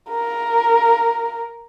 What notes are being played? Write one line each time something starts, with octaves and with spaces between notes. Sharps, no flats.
A#4